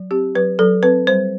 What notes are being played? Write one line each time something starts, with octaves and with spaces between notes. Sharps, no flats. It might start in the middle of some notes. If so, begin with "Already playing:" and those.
Already playing: F#3
C4 G4
F#3 B4
F#3 A4
C4 B4
G3 C5